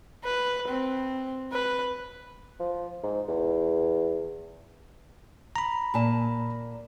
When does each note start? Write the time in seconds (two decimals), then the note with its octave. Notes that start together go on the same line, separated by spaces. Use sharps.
0.24 B4
0.68 C4
1.52 B4
2.60 F3
3.03 G#2
3.28 E2
5.56 A#5 B5
5.94 A#2 A5